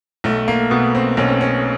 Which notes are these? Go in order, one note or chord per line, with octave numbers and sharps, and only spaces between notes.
B1 A3
A#3
B2 B3
C4
B1 C#4
C4
C#4